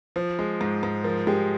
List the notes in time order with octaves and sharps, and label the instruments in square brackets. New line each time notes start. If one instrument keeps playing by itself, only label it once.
[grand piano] F3 [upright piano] C5
[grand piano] G#3
G#2
G#2
[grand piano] F3 [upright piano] A#4
[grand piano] G#3 [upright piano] G4